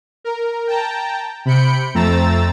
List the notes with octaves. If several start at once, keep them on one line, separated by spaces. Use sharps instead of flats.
A#4
G5 A5 A#5
C3 B5 G6 C#7 D7
F2 A3 C4 A#5 E6 A6